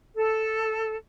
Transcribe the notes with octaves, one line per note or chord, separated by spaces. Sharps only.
A4